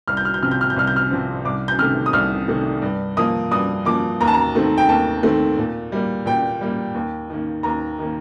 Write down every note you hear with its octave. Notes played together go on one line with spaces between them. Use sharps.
C2 F6
G6
F6
G6
C3 F3 C4 F6
G6
F6
G6
C2 F6
G6
F6
C3 F3 C4
C2 D6
G6
C3 D#3 A3 F6
D#6
C2 F6
C3 D#3 A3
G2
F3 A#3 D#6
G2 D#6
F3 A#3 D6
D#2 A#5
A5
A#5
D#3 A3 C4
G5
D#2 A5
D#3 A3 C4
A#2
G3 A#3
A#2 G5
G3 A#3
D#2
D#3 A#3
D#2 A#5
D#3 A#3